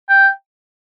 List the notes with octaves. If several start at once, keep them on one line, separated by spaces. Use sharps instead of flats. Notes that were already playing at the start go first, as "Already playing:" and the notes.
G5